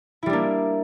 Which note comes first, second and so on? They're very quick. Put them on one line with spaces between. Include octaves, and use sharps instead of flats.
E4 G3 D4 A#3